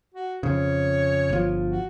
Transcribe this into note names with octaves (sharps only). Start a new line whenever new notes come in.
F#4
F2 C#3 C#5
G1 F3
F#4